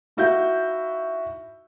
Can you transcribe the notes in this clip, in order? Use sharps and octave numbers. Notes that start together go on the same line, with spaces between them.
D#4 E4 F#4 E5 F5 G6